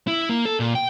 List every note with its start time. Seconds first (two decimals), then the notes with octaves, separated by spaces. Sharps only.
0.08 E4
0.29 A#3
0.45 A4
0.60 A#2
0.75 G5